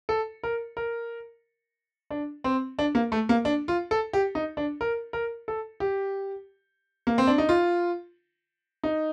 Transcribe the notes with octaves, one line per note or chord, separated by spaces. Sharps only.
A4
A#4
A#4
D4
C4
D4
A#3
A3
A#3
D4
F4
A4
G4
D#4
D4
A#4
A#4
A4
G4
A#3
C4
D4
D#4
F4
D#4